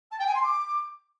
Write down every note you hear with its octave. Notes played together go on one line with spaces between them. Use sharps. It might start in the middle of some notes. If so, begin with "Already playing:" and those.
A5
G5
G#5
C6
D6